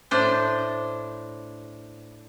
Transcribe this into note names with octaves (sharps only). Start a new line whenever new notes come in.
A2 D4 C5